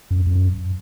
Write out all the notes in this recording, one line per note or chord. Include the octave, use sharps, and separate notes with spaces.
F#2
F#2